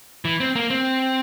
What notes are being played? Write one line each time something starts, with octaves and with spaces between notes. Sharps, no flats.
E3
C4
A#3
C4